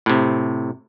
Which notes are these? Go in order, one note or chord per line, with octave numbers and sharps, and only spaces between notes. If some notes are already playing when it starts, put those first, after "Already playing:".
A2 C3